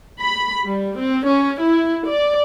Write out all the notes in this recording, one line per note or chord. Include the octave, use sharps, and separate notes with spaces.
B5
G3
C4
C#4
E4
D5